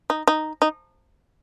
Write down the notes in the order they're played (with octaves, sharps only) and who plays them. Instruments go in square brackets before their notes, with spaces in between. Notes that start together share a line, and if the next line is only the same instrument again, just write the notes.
[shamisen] D#4
D#4
D#4